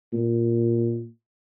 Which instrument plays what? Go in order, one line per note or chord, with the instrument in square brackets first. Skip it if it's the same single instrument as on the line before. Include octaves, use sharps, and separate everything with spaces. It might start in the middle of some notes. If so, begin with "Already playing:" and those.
[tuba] A#2